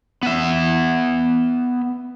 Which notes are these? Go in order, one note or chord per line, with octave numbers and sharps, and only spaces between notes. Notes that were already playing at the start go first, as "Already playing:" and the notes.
B3 E5